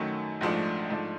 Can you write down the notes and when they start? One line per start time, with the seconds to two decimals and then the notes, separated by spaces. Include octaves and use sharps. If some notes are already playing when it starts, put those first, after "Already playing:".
Already playing: F#2 D#3 F#3 A3
0.41 A#1 G#2 F3 A3 D4
0.90 G#2 F3 A3 D4